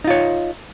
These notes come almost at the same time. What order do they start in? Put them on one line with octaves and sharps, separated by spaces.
D#4 F4 C#5